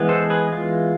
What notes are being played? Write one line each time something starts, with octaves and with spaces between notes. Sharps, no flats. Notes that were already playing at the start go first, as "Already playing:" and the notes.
Already playing: E3 G#3 B3
A4 C5
G#4 B4
F4